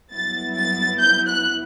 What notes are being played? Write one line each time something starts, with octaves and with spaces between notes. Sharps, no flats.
G2 F#3 B3 E4 A6
A6
G6
F#6